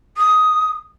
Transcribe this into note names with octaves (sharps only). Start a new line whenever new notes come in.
D#6